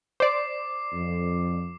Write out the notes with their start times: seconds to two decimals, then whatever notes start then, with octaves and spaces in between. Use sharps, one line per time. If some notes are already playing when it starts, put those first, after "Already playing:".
0.20 C5 D5 D6 C7
0.93 F2